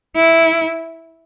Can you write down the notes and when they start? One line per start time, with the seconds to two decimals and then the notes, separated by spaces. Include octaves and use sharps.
0.16 E4